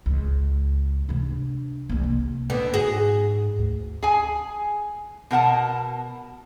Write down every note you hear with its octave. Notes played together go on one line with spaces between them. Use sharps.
C#2
C3 D4
C2 A#3
C3
D3 B3
G#2 F#4 G#4
D2
G#4 G#5
B2 A#4 F#5 A5